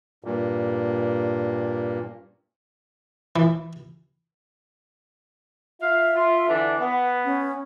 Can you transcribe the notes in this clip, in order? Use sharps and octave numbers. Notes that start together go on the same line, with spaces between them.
G2 A#2
E3
F4 E5 F5
F4
D3 E3 D4
B3
C#4